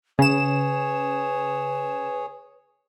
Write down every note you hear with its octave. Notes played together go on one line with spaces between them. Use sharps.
C#3 G#4 B4 C#5 E7